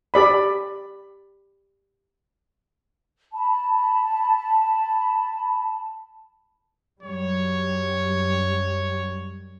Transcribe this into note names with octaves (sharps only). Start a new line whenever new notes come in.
G4 D5 B5
A5 B5
F#2 F#3 G3 C#5